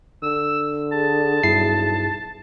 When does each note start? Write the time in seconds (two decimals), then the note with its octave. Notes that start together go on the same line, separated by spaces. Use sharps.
0.23 D3 E6
0.92 G#4 A5
1.43 B1 G2 E4 C7